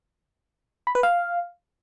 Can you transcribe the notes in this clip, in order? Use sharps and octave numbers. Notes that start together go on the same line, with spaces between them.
B5
B4
F5